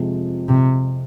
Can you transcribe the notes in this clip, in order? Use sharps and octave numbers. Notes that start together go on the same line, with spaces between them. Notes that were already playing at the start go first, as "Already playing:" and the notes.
Already playing: F2 C3 F3 G#3
C3